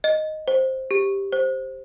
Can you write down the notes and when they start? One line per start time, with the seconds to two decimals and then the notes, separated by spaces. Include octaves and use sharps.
0.04 D#5
0.48 C5
0.91 G4
1.32 C5